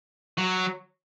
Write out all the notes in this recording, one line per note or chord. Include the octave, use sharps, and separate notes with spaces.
F#3